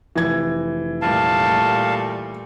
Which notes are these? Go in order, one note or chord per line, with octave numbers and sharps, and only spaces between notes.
F1 E3 G#6
A#2 G3 A3 F5 A5